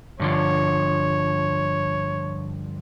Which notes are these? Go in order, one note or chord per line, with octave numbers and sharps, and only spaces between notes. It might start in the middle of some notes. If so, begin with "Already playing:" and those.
G2 D3 F3 C#5